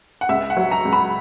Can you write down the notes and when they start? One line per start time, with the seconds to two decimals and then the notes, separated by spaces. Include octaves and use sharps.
0.21 F#5
0.29 C#2 E5
0.50 F#5
0.57 F#3
0.71 A#5
0.85 C#2
0.93 B5